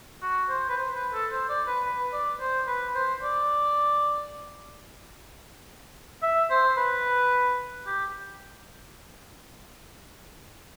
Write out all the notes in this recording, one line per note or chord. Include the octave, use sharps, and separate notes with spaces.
F#4
C5
B4
C5
B4
A4
C5
D5
B4
B4
D5
C5
B4
C5
D5
E5
C5
B4
G4